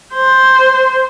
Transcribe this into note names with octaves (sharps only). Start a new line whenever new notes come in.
C5